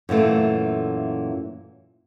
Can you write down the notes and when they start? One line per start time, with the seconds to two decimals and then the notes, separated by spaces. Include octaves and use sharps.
0.09 F#2 A#2 E3 A3